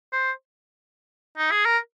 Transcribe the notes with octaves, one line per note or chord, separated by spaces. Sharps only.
C5
D#4
G#4
A#4